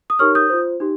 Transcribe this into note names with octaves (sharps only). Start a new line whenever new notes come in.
D#6
D#4 G4 A#4 C#5 C#6 F6
D#6 G6
F4 C5
D#4 G4